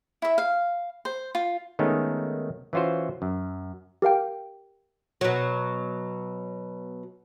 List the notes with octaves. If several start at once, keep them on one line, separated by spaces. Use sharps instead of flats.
E4 E5
F5
C5
F4
D#3 G#3 A3 B3 C#4 D#4
E3 C#4 F4 F#4 C5
F#2
G4 A#4 F5 G5
B2 F#3